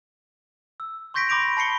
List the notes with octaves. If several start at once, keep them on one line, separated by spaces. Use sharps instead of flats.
E6
C6 C#6 G6 A#6 B6 D7
B5 C6 D6 A#6 D7 F7
A5 B5 C7 C#7 G7